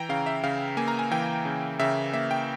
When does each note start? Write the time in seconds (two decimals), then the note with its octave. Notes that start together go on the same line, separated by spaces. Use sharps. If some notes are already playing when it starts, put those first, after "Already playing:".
Already playing: E3 G5 A#5
0.09 C#3 F5
0.26 E5
0.43 C#3 F5
0.77 A#3 G#5
0.88 A#5
0.99 G#5
1.11 E3 G5
1.45 C#3
1.79 C#3 E5
2.13 A#3 E5
2.31 G5